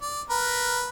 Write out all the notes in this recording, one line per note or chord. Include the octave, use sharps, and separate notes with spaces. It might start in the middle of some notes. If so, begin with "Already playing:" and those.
D5
A#4 B4